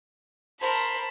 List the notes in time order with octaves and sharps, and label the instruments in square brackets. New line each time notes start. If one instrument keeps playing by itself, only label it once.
[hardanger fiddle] A#4 C5 [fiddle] A5 B5